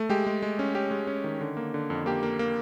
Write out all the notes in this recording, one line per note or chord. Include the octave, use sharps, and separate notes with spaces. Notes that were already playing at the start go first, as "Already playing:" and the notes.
Already playing: A3
G#3 G4
G#3
G#3
C#4
C#4 G4
G#3
C#4
D#3
D3
A#3
D3
F2
A#3 G4
A#3
A#3